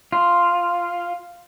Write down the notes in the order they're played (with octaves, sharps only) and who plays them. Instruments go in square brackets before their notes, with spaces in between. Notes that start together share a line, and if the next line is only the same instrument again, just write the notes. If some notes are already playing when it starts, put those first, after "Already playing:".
[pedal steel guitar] F4